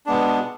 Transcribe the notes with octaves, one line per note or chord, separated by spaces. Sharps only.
B2 G#3 B3 D4